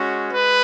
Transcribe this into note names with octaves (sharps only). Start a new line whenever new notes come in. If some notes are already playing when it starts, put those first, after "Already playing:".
Already playing: G#3 C#4 F#4
G#3 B4